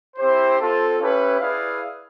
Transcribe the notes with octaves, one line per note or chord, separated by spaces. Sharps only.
C4 E4 G4 C5
C4 F4 A4
C#4 E4 G4 B4
E4 G#4 B4 D5 F5